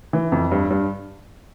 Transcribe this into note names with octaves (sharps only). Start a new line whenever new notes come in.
E3
F2
G2
G2